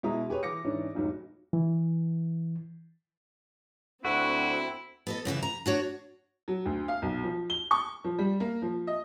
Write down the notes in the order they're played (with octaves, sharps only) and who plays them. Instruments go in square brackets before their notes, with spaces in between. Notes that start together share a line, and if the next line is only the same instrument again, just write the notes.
[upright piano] B2 G#3 E4 A#5 D#6
G4 G#4 B4 C#5
E3 D6 A#6 C#7
G#2 E3 C#4 D4
F1 B1 G#2 F#3
[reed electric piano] E3
[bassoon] D2 [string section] C4 [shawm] E4 [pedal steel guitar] F#4
[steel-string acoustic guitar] B3 A4 D#5
F#2 C#3 E3 E5
A#5
D4 F#4 C#5
[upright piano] F#3
D2
F5
B1
F3
G7
C#6
F3
G3
A#3
F3
D#5